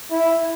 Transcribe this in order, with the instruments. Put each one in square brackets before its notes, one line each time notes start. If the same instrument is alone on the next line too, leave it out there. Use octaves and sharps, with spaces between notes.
[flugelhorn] E4